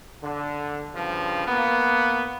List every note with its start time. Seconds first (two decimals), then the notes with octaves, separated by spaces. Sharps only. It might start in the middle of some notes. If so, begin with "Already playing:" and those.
0.23 D3
0.95 G2 C#3 F3
1.48 A#3 B3